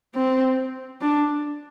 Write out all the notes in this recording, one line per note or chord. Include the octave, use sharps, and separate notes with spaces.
C4
D4